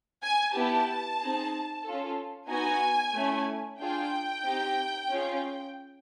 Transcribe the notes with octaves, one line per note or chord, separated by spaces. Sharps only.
G#5
B3 E4 G4 A5
C4 D#4 G#4
C#4 F4 A4
B3 D#4 F#4 G#5
A3 C#4 E4
D4 F4 G#4 G5
C4 D#4 G4
C#4 F4 G#4